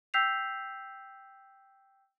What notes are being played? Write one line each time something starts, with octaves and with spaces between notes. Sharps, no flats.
G5 E6 G6 B6 C7 F7